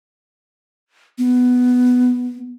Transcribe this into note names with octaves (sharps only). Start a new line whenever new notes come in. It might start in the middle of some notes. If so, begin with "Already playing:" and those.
B3